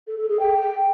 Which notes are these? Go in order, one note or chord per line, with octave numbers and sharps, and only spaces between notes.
A4
A4
G#4
G5